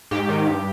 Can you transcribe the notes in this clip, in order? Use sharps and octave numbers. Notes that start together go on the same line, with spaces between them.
G#2 G4
D#3
G2